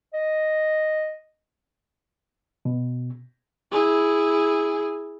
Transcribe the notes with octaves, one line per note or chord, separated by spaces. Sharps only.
D#5
B2
E4 G#4